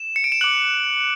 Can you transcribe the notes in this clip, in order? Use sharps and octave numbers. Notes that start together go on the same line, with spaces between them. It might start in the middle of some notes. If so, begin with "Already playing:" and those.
Already playing: E7
C#7
D7
E7
D6 F#6 F#7